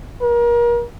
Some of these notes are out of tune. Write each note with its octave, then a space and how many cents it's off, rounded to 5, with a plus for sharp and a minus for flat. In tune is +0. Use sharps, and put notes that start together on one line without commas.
A#4 +35